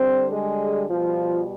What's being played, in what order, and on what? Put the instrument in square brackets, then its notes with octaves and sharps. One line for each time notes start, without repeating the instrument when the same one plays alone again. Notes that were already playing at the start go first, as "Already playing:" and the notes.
Already playing: [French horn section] D3 G3 C4 C5
G#3 G#4
B2 F3 G3 F4